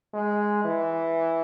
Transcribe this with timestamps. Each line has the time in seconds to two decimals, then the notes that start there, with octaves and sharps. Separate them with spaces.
0.14 G#3
0.65 E3